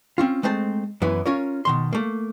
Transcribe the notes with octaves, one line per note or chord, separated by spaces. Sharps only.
C4 C#4 F4
G#3 A3 C4 C5 A5
F#2 E3 B3 E4
C#4 F4 A#4 C#5
B2 D#3 C6
A3 A#3